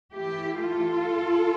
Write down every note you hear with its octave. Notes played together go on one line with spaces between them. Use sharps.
E3 A3 E4 G4
F4 A4